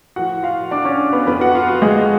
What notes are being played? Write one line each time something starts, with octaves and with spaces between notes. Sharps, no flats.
A2 F3 F#4 F#5
F4 F5
D4 D5
C#4 C#5
B3 B4
F2 F3 B3 B4
F#4 F#5
F4 F5
F#4
G#3 G#4